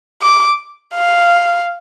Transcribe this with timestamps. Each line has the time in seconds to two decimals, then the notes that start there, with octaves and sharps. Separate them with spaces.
0.22 D6
0.95 F5